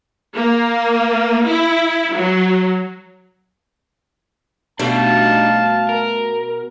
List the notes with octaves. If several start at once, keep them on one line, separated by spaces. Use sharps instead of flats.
A#3
E4
F#3
B2 G3 A3 D4 D#4 F5 A5
A#4